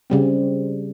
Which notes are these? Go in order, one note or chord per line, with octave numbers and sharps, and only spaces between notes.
C#3 G3 C4